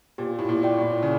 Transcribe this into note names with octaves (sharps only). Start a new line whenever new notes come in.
A#2 G4
A2
A#2
D5 G5
A2
C#3